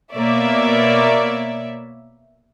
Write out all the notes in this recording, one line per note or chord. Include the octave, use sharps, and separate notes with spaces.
B2 A#3 C#5 D5 E5